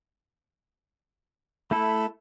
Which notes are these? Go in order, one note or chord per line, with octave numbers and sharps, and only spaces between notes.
A3 E4 A4 B5